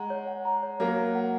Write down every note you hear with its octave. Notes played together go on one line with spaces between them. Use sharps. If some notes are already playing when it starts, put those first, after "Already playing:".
Already playing: G#3 F#5 A#5
C#5
F#5
A#5
C#5
F#3 A#3 C#5
C#5
F#5